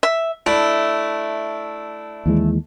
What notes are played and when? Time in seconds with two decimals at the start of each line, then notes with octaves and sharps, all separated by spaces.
0.03 E5
0.46 A3 D4 E4
2.26 D#2 E3 G#3